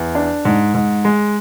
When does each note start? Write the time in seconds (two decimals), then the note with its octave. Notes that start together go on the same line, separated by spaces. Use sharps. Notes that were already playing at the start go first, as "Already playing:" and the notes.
Already playing: E2
0.15 D4
0.45 G#2
0.74 G#2
1.05 G#3